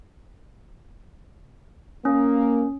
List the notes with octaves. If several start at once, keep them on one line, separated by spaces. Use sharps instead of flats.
A#3 C#4